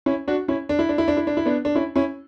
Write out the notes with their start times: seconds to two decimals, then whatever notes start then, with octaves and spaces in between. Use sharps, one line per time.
0.06 C#4 E4
0.28 D4 F#4
0.48 C#4 E4
0.69 D4
0.79 E4
0.89 D4
0.98 E4
1.08 D4
1.17 E4
1.27 D4
1.37 E4
1.46 B3 D4
1.65 D4
1.75 C#4 E4
1.96 C#4 E4